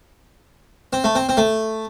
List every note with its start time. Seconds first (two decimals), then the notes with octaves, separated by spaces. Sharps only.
0.93 C4
1.04 A3
1.15 C4
1.29 C4
1.37 A3